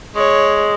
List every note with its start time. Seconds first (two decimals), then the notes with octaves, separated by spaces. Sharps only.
0.15 G#3 C#5